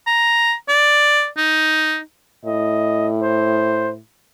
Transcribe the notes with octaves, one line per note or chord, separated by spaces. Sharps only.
A#5
D5
D#4
A2 D#5
C5